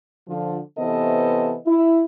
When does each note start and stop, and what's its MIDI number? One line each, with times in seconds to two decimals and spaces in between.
0.28 0.59 50
0.28 0.59 53
0.78 1.56 48
0.78 1.56 52
0.78 1.56 59
0.78 1.56 69
0.78 1.56 72
0.78 1.56 75
1.66 2.03 64